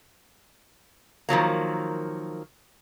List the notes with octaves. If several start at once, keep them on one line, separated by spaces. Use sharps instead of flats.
D#3 F3 F#3 A#3